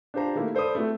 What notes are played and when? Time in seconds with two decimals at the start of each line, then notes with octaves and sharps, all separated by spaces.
0.14 D4 F4 G4 C5 A5 A#5
0.35 D#3 A3 A#3 E4
0.55 A4 C5 D5 B5 D#6
0.75 A3 C4 E4 F#4